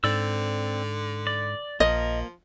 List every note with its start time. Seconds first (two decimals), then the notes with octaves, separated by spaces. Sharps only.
0.04 G#2 D3 C4 D5 E6
1.27 D5
1.80 A#1 F3 A#3 D#5